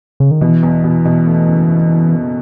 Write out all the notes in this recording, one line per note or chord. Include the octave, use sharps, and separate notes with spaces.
C#3
D#3
B2 E3
E2
B2
B2
A3
F#1